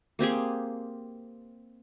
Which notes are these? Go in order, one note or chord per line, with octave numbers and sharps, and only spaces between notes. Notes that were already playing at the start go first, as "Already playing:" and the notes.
A#3 C4 G4 G#4